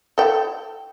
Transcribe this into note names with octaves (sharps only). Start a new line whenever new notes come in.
A4 G5